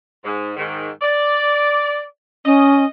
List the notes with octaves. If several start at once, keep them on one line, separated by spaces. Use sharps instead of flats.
G#2
G#2 D#3
D5
C#4 D#5